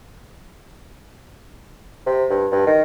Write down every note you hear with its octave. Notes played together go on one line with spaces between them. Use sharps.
C3
G2
G2
D#3